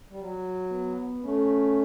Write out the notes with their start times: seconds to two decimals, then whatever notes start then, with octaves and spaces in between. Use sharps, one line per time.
0.10 G3
0.19 F#3
0.71 B3
1.24 A3 C#4